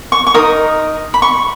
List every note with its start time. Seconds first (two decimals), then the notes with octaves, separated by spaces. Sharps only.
0.12 C#6
0.27 C#6
0.34 D#4 A#4 D#5 D#6
1.14 B5
1.22 C#6